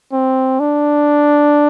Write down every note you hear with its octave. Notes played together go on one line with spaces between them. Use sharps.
C4
D4